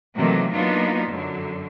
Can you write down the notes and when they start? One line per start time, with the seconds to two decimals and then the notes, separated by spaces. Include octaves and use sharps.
0.14 C3 D#3 E3 F#3 A3 A#3
0.53 F#3 A#3 B3 D4 D#4 F4
1.09 F#2 D3 F#3